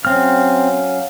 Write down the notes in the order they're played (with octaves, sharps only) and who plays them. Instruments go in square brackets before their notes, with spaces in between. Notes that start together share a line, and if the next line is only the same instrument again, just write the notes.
[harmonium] F#3 C#4 F5 [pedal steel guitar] C4 F6